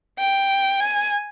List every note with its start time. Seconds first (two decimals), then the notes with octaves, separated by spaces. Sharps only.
0.19 G5
0.80 G#5